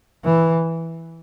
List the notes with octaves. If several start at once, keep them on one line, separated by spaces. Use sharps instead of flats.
E3